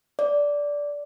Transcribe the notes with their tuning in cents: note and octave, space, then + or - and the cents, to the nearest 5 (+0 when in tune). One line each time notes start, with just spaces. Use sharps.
D5 -10